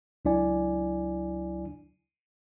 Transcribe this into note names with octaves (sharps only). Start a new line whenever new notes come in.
C#2 F#3 D4 E4 D5 G#5